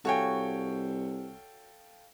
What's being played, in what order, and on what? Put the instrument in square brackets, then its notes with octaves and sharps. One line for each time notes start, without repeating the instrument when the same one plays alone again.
[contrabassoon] C2 [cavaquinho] F#4 C#5 G#5 [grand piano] A4 F5 G5